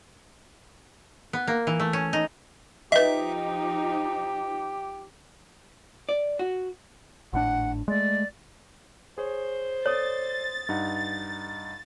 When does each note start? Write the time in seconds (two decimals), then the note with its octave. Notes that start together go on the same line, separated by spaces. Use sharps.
1.33 B3
1.47 A#3
1.67 E3
1.80 A3
1.93 C#4
2.13 D#4
2.92 F3 D#4 G4 B4 D#5 E5
6.09 D5
6.39 F#4
7.33 G#1 A2 D4 F#5
7.88 G#3 A3 D5
9.18 G#4 C5 C#5
9.86 A4 C#5 D5 D#6 A6
10.69 G2 D#4 F#5